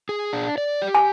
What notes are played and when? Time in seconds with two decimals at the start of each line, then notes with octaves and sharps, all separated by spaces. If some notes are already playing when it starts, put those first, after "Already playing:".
0.09 G#4
0.33 D4
0.58 D5
0.82 G4
0.95 G#5